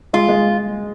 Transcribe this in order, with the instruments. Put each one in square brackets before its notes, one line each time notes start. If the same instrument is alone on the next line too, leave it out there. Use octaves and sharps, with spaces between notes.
[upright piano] G#3 [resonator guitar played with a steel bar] F4
[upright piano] G#3